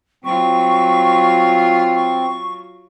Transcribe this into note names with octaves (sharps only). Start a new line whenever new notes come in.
F#3 C4 F4 C#6
C#6